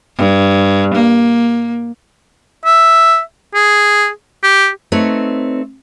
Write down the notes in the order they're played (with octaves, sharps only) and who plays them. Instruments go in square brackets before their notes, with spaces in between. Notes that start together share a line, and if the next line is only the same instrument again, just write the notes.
[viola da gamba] G2
A#3
[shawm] E5
G#4
G4
[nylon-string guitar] A3 C4 D#4 B4 C#5